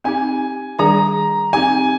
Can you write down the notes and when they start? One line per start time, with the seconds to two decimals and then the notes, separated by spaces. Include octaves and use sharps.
0.04 C4 D#4 G4 G#5
0.79 D#3 G3 D4 G#4 D5 A#5
1.53 C4 D#4 G4 G#5